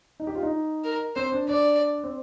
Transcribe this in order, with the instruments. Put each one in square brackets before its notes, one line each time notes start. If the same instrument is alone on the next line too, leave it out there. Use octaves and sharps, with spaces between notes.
[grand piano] D#4
G4
F4
D#4
[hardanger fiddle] A#4
[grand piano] C4 [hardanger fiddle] C5
[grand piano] D4
[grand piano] D4 [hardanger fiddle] D5
[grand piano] C4